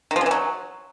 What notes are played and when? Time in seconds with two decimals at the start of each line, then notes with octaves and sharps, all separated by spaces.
0.11 D#3
0.16 F3
0.21 C#3
0.26 E3
0.31 F#3